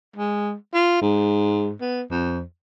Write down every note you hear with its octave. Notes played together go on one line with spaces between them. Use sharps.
G#3
F4
G#2
B3
F2